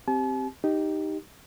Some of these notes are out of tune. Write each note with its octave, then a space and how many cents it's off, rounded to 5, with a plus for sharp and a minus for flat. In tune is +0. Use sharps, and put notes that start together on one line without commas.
C4 +0 G4 +0 A5 -45
D#4 +0 G4 +0